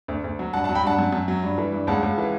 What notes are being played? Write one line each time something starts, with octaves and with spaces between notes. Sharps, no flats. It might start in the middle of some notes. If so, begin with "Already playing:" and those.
D2
D2
F#3
G2 F#5 A5
F#5 A5
F#3
G5 B5
G2 F#5 A5
F#2
F#2
F#3
G2
E3
G2
C#2 F#5 A5
C#2
E3